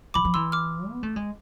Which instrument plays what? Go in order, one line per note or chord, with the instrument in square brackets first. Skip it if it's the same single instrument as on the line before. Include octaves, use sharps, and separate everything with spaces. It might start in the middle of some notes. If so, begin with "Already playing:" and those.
[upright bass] E3 [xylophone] B5 D6
[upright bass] F3
[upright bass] E3 [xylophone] C6 E6
[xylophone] D6 F6
[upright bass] B3
A3
G#3